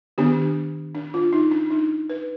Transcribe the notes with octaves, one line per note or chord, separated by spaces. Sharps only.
D#3 B3 D4 G4
D4
F4
D#4
D4
D#4
B4